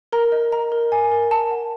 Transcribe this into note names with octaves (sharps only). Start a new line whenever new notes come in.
A#4 A#5
D#5
D#5 A#5
A#4
A#4 G#5
A#4
A#4 A5
F#5